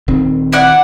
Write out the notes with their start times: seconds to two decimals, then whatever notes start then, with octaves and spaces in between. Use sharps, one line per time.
0.08 D#1 D#3 C4
0.53 E4 D5 F#5